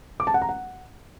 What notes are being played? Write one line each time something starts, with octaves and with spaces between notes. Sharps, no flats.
D6
A5
F#5
A#5
F#5